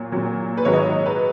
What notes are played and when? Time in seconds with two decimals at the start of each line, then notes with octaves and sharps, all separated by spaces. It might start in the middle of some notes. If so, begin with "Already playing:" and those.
Already playing: A#2 F#3
0.12 A#2 F#3
0.57 B4
0.65 G#2 D#3 F#3 C#5
0.73 D#5
0.79 C#5
0.92 C#5
1.06 B4